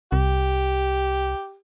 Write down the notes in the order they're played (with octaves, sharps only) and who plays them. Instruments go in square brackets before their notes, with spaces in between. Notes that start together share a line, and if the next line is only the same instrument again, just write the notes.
[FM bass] C2 [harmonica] G4